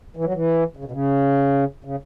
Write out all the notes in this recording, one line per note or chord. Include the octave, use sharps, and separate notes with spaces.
E3
F#3
E3
C#3
B2
C#3
C#3